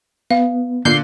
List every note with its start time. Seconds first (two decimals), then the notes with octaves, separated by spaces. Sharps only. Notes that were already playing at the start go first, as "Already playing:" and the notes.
0.31 B3 F5
0.85 A#2 D3 A#3 G6 C7